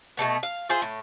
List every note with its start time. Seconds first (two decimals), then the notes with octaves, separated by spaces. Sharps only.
0.17 B2 D3 A3 B3
0.43 F5
0.69 F4 G#4 C5 E5
0.82 A2